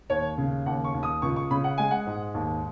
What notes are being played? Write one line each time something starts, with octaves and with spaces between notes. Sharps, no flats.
D#2 C#5
C#3
D#2 F#5
C#6
D#2
D#6
C#2 C#6
C#6
C#3 B5
F#5
G#3 G#5
F#5
G#2
D#2